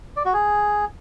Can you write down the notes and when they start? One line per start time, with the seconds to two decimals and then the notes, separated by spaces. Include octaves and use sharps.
0.17 D5
0.25 F#4
0.33 G#4